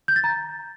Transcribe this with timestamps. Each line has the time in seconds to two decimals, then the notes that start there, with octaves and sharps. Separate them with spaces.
0.08 G6
0.16 A6
0.24 A#5